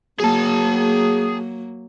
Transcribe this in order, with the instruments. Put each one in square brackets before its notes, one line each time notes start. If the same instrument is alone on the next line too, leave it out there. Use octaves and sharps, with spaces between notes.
[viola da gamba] F#3 A#3 [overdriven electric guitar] G#4 A5